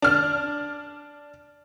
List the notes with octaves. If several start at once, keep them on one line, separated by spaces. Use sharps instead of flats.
D4 F6